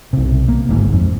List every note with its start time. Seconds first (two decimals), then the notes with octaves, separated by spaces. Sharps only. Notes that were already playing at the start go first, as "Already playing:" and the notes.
0.13 B1 C3
0.48 A#3
0.69 G1 G#2
0.93 F2